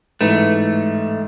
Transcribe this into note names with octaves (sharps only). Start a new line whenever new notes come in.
A1 G#2 A3 B4